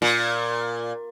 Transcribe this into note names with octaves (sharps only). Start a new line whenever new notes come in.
A#2